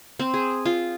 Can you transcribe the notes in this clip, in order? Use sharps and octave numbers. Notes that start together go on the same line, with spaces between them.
C4
G#4
F4